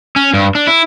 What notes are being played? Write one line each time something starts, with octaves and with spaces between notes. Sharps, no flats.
C#4
G2
D4
E4